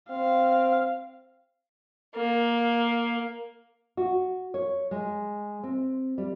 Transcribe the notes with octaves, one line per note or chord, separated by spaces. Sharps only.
C4 F5
A#3
F#4
C#5
G#3
C4
G3